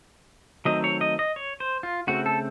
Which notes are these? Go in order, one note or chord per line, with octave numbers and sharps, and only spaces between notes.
D#3 F#3 A3 C4 D#5
C#5
D#5
D#5
C#5
C5
F4
C#3 A3 C4 F#4
A4